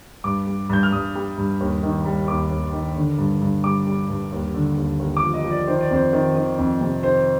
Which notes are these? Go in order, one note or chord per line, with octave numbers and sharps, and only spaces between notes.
G2 D6
G3
G2 G6
F6
G2 D#6
G3
G2
D#2
D#3
G3
D#2 D6
D#2
D#3
D3
G2
G2
G3 D6
G3
G2
D#2
D3
D#2
D#2
D6
F3
D#5
F3
D5
D#3 C5
D5
F2 C5
D#3
D#3
F2
C3
D#3 C5